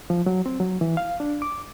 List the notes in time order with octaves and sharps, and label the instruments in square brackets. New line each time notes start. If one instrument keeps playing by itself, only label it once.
[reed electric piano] F3
F#3
C4
F#3
E3
F5
D4
D6